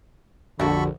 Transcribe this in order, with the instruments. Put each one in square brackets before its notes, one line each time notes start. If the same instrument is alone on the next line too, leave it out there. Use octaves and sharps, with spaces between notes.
[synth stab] A#1 [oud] F2 F#4 [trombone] D3 [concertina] A4 B5 C#6